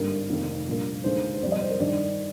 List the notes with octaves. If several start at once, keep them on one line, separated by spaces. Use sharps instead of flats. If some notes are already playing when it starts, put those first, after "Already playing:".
Already playing: G#1 G2 D3 G3 A#3 A#4
F1 F2 D#3 A#3
A#1 A#2 G3 A#3
D#2 D3 G#3 C5
C5
F2 C3 G3 D5
D#5
C5
A#4
G2 D#3 G3 D5